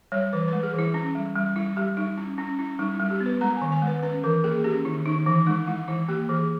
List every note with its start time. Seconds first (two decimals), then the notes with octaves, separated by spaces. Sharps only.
0.12 G3 C#5
0.33 E3 B4
0.48 G#3 B4
0.63 G#4
0.74 E3 E4
0.94 C#4 E4
1.15 G3
1.35 G3
1.56 G3 E4
1.76 G3 G4
1.97 G3 D#4
2.18 C#4 E4
2.38 C#4 E4
2.59 C#4 E4
2.79 G3 D#4
2.95 G3 E4
3.10 G4
3.21 B3
3.26 B4
3.41 G#3 A#5
3.57 D#3 G#5
3.72 G#5
3.82 G#3 B4
4.03 C#4 B4
4.24 E3 A#4
4.44 A#3 G#4
4.64 C#4 G4
4.85 D#3 E4
5.05 D#3 D#4
5.26 E3 D#4
5.47 G#3 D#4
5.67 G#3 E4
5.88 E3 E4
6.08 A#3 G4
6.29 E3 G#4